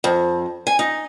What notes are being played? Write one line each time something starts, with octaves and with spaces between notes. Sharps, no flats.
F2
G#5
D#4